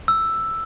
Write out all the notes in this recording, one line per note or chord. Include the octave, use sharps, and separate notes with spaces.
E6